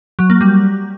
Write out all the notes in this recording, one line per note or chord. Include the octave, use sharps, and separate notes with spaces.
F#3
A#3
G3